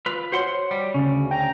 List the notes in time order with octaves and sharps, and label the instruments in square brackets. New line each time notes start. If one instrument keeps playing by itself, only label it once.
[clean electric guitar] F4 B4
[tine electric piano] F#4 C#5 [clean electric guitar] C5 F#5 C6
[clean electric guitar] G3
[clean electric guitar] D2 C#4 [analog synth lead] C#3
[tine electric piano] G5 [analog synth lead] A#5